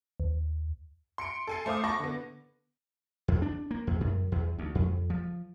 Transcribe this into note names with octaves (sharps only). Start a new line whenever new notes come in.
D#2
C6 C#7 D7
A4 G#5 C7
A3 C5 F5 D6 D#6
A5 B5 C#6 D6 A#6
D3 B3
E2
D4
A#3
E2
F#2
E2
D2
F2
F3